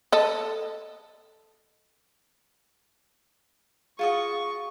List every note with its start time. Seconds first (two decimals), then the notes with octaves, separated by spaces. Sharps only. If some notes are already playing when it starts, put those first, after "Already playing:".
0.12 A4 D#5
3.99 F4 F#4 G#4 D#5 C#6